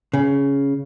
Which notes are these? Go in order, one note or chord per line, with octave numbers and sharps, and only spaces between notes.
C#3